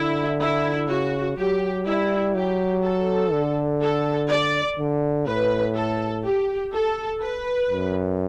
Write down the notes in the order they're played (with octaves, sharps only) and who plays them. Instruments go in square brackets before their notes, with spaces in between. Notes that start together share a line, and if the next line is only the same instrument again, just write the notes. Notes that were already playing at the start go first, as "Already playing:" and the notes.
Already playing: [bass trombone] D3 [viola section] E4
[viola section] E4
[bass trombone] C#3 [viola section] F#4
[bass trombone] F#3 [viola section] G4
[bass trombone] G3 [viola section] E4
[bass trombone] F#3 [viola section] G4
[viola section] A4
[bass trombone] D3
[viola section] A4
D5
[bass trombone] D3
[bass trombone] A2 [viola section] B4
[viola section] A4
G4
A4
B4
[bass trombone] F#2